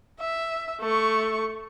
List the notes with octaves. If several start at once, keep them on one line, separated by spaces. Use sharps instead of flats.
E5
A3 C#6